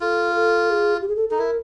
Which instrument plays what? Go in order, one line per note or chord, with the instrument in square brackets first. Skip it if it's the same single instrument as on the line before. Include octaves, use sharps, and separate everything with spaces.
[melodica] F4 [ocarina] A4
[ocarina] A4
G#4
G4
G#4
A4
[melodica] D#4 [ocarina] A4
[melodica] E4 [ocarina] A#4